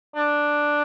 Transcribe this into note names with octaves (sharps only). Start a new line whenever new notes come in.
D4